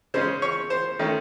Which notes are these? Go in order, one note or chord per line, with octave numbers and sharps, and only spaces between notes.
C#3 G#3 C#4 C5
C#5
C5
D#3 A3 C#4